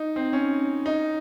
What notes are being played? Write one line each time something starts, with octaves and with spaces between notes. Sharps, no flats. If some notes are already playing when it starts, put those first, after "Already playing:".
Already playing: D#4
C4
C#4
D#4